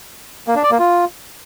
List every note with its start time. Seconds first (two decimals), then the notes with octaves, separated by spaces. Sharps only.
0.48 A#3
0.55 D4
0.63 D5
0.71 A#3
0.79 F4